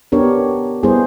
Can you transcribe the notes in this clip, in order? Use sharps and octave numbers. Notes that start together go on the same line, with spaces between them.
B3 D4 G4 A#4 C#5
G3 B3 E4 G#4 C5